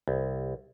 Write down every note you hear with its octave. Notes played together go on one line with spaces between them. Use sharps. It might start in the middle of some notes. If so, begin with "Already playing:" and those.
C2